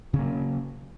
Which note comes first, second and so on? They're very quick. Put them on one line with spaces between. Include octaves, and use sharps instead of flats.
C#3 C#4 A#3 F#3